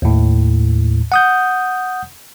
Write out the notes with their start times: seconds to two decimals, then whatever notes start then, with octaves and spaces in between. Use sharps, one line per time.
0.02 D#2 A2
1.12 F#5 D#6 G6